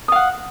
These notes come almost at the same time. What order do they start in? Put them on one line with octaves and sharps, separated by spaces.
D#6 F5 F#5